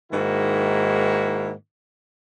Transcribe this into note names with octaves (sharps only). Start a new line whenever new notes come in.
G#2 D#3 A#3 E4 F#4